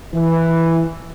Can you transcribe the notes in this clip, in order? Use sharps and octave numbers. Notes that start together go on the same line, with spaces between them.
E3